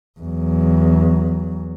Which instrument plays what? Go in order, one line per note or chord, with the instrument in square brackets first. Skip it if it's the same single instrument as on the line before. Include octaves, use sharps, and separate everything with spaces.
[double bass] E2 F#3